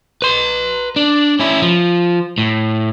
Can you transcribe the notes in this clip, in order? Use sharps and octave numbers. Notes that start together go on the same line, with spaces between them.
B4 C6
D4
C#4 E4
F3
A2